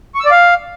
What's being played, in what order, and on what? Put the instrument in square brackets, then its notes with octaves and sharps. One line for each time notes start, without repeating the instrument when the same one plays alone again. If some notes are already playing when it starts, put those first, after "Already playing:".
[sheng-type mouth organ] C#6
E6
D5
F5